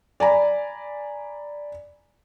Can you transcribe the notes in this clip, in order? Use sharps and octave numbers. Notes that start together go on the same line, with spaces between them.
D5 G#5 A#5 B5